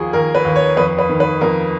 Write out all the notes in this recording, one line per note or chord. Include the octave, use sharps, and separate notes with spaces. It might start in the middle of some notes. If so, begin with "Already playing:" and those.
Already playing: D#2 F3 G#4
D#2 A#4
B4
D#2
C#5
F2 B4
B4
D#3
B4
F2 A#4